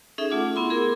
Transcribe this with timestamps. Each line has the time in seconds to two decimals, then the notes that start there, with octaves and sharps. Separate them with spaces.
0.18 C#4 D#4 G#4 A4 E5
0.30 A3 F4 F#5 D6
0.56 B3 E4 C6
0.70 G#4 A#4